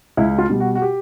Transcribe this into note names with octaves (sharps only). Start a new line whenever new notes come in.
C#2 E4
F4
B2 G3
F#4
F#4
G4